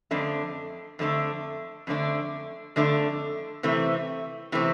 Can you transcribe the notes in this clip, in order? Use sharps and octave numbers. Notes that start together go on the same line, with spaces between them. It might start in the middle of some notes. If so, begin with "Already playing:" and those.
F2 D3 A3 D4
F2 D3 A3 D4
F2 D3 A3 D4
F2 D3 A3 D4
C3 E3 A3 C4
C3 E3 A3 C4